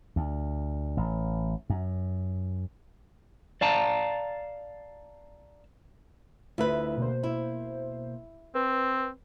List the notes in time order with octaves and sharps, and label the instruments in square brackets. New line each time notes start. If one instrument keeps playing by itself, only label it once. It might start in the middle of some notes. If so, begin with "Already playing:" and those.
[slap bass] D2
A1
F#2
[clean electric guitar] D5 F5 A5 A#5
[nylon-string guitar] D2 B4 [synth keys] E4 F4 E5
[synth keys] B2 A#3 C5
[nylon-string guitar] E4
[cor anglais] C4 [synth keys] B4